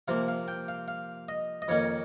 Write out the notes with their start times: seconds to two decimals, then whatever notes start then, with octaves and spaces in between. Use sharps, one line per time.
0.08 C3 F3 A#3 F5
0.28 F5
0.48 G5
0.68 F5
0.88 F5
1.29 D#5
1.62 D#5
1.68 F2 D#3 A#3 C#4 C#5